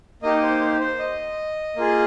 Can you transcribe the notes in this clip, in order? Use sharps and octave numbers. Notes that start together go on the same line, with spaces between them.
A#3 D#4 G4 D#5
C5
C5
C5
D#5
A#3 F4 G#4